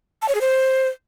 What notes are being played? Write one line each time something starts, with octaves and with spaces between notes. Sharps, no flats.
A5
C#5
G#4
C5